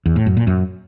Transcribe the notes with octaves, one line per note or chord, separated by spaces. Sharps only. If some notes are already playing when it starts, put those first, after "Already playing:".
E2
A2
F#2
A#2
F#2